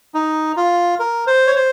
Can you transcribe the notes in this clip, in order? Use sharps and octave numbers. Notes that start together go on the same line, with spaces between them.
D#4
F4
A#4
C5
C#5
C5